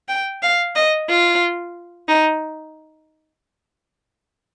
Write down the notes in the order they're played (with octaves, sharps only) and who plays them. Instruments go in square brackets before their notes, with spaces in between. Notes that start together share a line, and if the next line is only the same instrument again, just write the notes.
[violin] G5
F5
D#5
F4
D#4